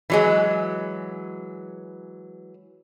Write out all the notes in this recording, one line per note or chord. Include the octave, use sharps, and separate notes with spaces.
E3 F#3 G#3